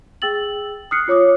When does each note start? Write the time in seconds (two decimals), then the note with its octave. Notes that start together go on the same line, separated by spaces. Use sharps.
0.22 G#4 G5 E6 A6 F#7
0.91 D#6 F6 F#6 C7 C#7
1.08 F4 C#5 D6 D#6